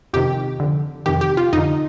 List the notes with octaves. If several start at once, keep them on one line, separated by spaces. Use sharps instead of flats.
F2 C3 D#3 G4
F2 D3
F2 C3 D#3 G4
G4
F4
F2 D3 D#4